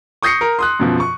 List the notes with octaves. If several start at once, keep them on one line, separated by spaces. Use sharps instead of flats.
C#6 D#6 G6 A#6 C7 C#7
A#4
C6 D#6 F#6
F#2 B2 F3
C#6